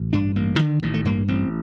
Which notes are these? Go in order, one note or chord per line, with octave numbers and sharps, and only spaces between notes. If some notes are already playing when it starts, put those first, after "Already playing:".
Already playing: A1
G2 D4
A1 A#3
F3
D3 D#3
A1 D#3
A3
G2 A#3
A1 C4